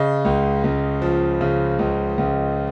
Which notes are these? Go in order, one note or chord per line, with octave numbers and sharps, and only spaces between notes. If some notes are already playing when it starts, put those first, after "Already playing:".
Already playing: C#3 D#5
C#2
C#2
F3
C#3
C#2
C#2